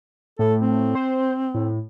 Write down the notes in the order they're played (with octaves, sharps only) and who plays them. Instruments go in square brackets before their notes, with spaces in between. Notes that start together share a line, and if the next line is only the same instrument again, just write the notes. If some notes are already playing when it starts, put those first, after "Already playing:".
[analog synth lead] A2 [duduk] A4
[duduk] C4
[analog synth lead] C5
A2